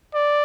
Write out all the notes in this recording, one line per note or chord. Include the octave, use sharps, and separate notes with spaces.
D5